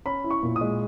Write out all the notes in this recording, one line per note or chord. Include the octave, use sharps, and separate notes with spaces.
C#4 B5
E4
C#6
A#2
D#6
G#3